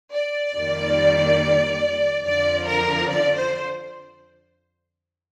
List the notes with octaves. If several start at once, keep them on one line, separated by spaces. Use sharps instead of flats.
D5
F2 D#3 G3 A#3
F2 D3 F3 D5
A#4
D5
C5